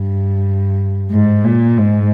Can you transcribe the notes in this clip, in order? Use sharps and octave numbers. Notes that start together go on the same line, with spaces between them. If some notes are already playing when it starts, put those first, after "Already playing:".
Already playing: G2
G#2
A#2
G#2